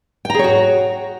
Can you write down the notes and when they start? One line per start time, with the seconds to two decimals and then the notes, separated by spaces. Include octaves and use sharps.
0.25 G5
0.30 A#5
0.34 G#4
0.39 C#5
0.44 F#4